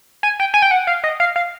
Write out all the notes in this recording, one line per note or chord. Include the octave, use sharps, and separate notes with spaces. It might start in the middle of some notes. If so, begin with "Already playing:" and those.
G#5
G5
G#5
G5
F#5
F5
D#5
F5
F5